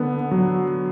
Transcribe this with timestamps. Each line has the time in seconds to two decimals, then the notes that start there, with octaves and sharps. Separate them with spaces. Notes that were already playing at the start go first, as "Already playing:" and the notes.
Already playing: D3 B3
0.31 F#3